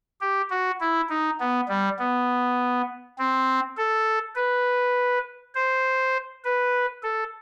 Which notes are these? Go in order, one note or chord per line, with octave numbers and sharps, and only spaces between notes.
G4
F#4
E4
D#4
B3
G3
B3
C4
A4
B4
C5
B4
A4